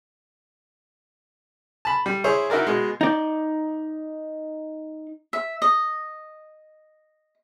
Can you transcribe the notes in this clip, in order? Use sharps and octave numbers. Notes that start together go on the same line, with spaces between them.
A5 B5
G3
E4 G#4 C5 C#5
D#4 E4 F#4 A#4 D5
B2 G#3
D#4 D5
E5
D#5